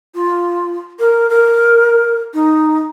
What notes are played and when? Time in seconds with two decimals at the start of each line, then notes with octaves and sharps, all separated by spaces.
0.15 F4
0.99 A#4
1.30 A#4
2.34 D#4